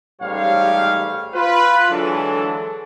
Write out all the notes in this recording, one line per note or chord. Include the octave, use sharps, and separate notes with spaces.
A1 G#2 G3 G4 C#5 F5
F4 B4
D3 E3 F#3 G#3 D4 A4